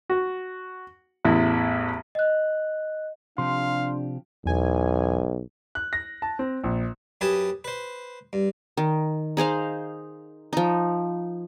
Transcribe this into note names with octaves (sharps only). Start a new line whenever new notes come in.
F#4
A1 E2 E4
D#5 F#6
C3 F3 D4 G4 F5 C6
B1 E2 G#5
F#6
A#6
A5
C4
A#1
F#2 G4 B4 G#5 A5 D#6
B4 C5
G2
D#3
D#4 G#4 C5 F5
F3 D#4